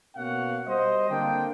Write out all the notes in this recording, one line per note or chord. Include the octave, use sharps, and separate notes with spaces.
B2 A#3 C#4 F#4 F5 F#5
G3 C5 D#5
D3 A#3 C4 D4 F4 G5